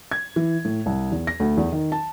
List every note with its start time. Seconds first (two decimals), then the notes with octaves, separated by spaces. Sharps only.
0.11 G#6
0.36 E3
0.65 A2
0.86 C2
1.12 E2
1.27 A#6
1.40 D2
1.57 E2
1.72 D#3
1.92 A5